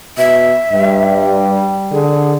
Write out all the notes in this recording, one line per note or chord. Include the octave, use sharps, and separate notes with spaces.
B2 E5
G2 G3
D3 G#4